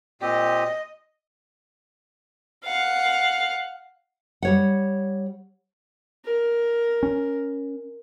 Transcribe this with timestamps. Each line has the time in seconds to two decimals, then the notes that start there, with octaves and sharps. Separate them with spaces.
0.21 A#2 C4 G4 D#5
2.65 F5 F#5
4.42 G3 C#5 F#5
6.25 A#4
7.03 C#4